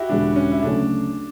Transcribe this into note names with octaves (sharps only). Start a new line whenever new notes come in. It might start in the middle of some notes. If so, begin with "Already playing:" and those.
Already playing: E4 F#4 G4
E1 E2 D3 G3 D4
C#4
E4
D2 C#3 F#3 A3 C#4 D4